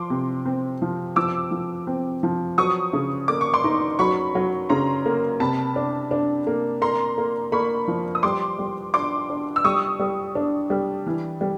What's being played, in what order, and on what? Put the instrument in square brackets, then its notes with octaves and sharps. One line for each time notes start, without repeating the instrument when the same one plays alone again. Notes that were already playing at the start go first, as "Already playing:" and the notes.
Already playing: [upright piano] F3 [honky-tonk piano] C6 D6
[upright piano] C3
C4
F3
[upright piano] F3 [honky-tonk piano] D6 E6
[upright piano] F3
C4
F3
[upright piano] F#3 [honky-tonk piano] C#6 D#6
[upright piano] C#3
[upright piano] A#3 [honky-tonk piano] D6
[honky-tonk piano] C#6
C6 D6
[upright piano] D#4
[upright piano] F#3 [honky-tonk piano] B5 C#6
[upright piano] F#3
[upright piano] C#3 [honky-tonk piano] A#5 C6
[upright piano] A#3
[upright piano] C3 [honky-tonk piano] A5 B5
[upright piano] D4
D4
A#3
[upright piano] A#3 [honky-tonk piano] A#5 C6
[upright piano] A#3
[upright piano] A#3 [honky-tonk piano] B5 C#6
[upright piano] F3
[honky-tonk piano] D#6
[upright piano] G3 [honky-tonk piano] C6 D6
[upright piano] G3
[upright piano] D4 [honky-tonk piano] C6 D6
[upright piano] D4
[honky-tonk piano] E6
[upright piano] G3 [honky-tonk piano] C#6 D#6
[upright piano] G3
D4
G3
E3
G3